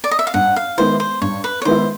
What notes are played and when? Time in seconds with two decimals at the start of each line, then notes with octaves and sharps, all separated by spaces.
0.04 D5
0.11 D#5
0.19 E5
0.27 F5
0.34 G2 F#5
0.56 F5
0.78 D#3 G#3 B3 E4 C5
1.00 C5
1.22 G2 C#5
1.44 B4
1.62 C#5
1.65 D#3 G#3 B3 E4 C5